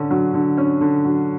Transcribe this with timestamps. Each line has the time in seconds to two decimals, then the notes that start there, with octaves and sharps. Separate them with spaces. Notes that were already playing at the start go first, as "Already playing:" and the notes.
Already playing: D3 C#4
0.10 F#3
0.34 D3
0.57 C#4
0.81 D3
1.05 F#3